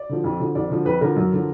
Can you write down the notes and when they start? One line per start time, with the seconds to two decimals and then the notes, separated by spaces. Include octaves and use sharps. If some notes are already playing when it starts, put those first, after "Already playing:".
Already playing: D5
0.09 D3 F3
0.24 F2
0.40 D3 F3
0.55 F2 D5
0.70 D3 F3
0.85 F2 B4
1.01 D3 F3 A#4
1.16 F#2
1.32 D3 F3